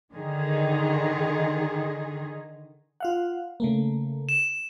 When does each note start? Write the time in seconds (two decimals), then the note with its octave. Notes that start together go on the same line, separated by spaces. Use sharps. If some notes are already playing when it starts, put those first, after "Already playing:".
0.11 D3 D#3 G#4
3.00 F4 F5 F#5
3.60 C#3 A3 A#3
4.29 E7